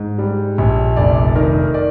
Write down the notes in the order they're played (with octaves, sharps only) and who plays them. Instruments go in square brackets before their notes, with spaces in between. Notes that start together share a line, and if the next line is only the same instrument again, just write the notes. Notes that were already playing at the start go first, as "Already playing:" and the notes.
Already playing: [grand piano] G#2
G3
A#1
F1 D5
D#3 A#4
D5